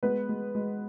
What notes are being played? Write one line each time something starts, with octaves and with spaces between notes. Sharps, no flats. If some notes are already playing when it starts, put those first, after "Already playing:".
G#3 B3 B4
G#3
G#3